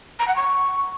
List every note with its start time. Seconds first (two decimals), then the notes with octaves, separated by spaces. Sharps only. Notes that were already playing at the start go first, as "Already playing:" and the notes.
0.19 A#5
0.28 F#5
0.36 C#6